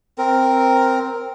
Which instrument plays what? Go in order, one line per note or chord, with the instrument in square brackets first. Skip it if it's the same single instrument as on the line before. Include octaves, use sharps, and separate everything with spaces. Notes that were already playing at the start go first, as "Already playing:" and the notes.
[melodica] C4 A#4